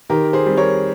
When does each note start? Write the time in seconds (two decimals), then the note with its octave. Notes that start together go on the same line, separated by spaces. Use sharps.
0.10 D#3 G4 A#4
0.33 G#4 C5
0.46 G3 C4
0.58 A#4 C#5